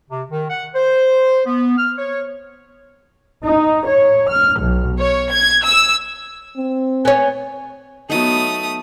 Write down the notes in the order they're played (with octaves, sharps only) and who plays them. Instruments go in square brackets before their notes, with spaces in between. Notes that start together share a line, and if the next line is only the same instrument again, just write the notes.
[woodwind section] C3
D#3
F#5
C5
B3
F6
C#5
[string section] D#4
C#5
F6
B1
C#5
G#6
E6
[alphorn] C4
[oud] B3 C#5 [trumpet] G#5
[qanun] F#3 B3 D#4 [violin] A3 D#6